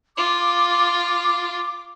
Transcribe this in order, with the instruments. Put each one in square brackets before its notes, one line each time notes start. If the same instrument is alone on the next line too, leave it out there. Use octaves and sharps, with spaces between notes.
[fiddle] F4 [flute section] D6